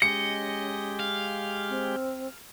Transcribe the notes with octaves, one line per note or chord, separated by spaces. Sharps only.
G#3 C#4 G4 D#5 C#7
F5
C4